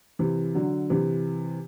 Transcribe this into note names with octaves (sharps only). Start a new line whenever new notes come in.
C3 E3
D3 F#3
C3 E3